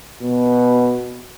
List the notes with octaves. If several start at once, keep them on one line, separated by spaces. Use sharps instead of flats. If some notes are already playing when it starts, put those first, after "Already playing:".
B2